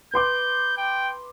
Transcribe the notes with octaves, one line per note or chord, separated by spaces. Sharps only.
B4 C6 D6 G6
G5